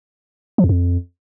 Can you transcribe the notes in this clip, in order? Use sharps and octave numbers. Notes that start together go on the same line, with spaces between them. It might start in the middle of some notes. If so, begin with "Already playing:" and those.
F3
E2
F2